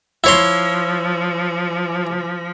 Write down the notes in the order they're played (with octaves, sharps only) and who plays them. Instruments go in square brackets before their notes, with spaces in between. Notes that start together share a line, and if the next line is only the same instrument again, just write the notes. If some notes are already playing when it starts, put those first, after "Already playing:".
[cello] F3 [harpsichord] E4 C#5 C6